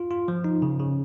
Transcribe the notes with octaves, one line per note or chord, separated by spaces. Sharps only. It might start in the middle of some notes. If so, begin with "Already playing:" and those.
Already playing: F4
F4
F3
D#4
C#3
C#3